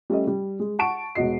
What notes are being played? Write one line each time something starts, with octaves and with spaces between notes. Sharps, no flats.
G3 A3 C#4 D#5
G3
G#3
F#5 A5 C#6 D7
E1 B2 F#4 D#5 C7